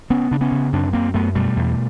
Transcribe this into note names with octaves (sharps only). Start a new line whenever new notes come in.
C#3 B3 C#4
C#3 D4
B3 C#4
C#3
F#2 C4 D4
F#2 A#3 C4
F#2 A3 B3
B2 G3 A3
E2